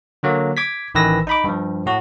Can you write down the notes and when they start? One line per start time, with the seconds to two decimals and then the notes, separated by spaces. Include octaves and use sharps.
0.23 D3 F#3 A#3
0.57 D6 G#6 B6
0.95 A1 D#3 E3 B4 E6 A#6
1.27 D#4 B5 D6
1.44 G2 F3
1.86 A2 F#4